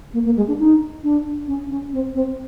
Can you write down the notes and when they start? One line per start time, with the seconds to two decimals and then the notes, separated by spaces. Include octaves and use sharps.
0.14 A#3
0.25 A#3
0.37 G#3
0.48 D4
0.59 D#4
1.04 D4
1.48 C#4
1.70 C#4
1.93 C4
2.15 C4